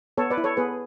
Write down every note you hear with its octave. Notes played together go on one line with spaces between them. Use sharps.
B3 A4 C#5
B4 D5
E4
A4 C#5
B3 G#4 B4